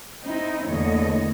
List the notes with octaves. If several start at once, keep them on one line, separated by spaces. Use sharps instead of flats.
C4 D#4 E4
E2 A2 D3 A#3 C#5 D#5